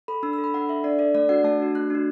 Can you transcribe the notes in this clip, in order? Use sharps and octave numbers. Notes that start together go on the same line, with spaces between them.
A4 B5
D4 E6
A4 E6
B5
D4 F#5
A4 E5
D4 D5
A4 D5
A3 D5
D4 F#4 F#5
A3 A5
D4 F#4
A3 F#6
D4 F#4